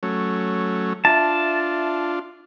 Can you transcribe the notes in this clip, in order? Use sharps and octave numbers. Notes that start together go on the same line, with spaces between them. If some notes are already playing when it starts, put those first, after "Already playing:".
F#3 A3 C#4
D4 F4 E5 A5